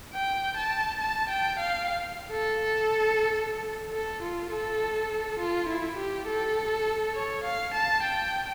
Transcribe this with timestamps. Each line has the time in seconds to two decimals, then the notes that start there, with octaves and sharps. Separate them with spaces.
0.13 G5
0.57 A5
1.01 A5
1.30 G5
1.59 F5
2.32 A4
3.93 A4
4.22 F4
4.51 A4
5.40 F4
5.69 E4
5.97 G4
6.28 A4
7.15 C#5
7.44 F5
7.74 A5
8.03 G5